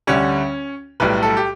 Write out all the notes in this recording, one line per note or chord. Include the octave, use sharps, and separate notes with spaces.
D2 D3 G3 C#4
B1 A2 G3 B4
A4
G4